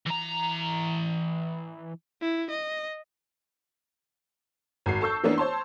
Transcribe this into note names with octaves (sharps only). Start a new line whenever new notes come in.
E3 A#5
E4
D#5
G#1 F#4 C7
A4 A5 C#6 E6 G6
E3 A#3 B3 C#4 D4
C5 C#5 A5 C6